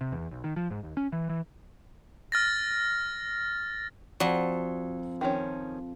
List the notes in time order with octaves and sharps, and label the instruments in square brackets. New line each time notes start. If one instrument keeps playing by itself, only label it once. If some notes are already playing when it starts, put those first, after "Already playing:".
[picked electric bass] C3
E2
B1
D#3
F3
G#2
D#2
C#4
E3
E3
[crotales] F6 A6 A#6
[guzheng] F2 [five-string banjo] F#4 D5 F#5
[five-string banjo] D#3 F3 C#4